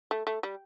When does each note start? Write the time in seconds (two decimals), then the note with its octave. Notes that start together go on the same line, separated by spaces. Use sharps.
0.11 A3
0.27 A3
0.43 G3